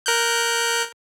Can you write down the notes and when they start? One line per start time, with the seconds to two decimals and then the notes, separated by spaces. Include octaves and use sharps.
0.06 A#4 F#6 G6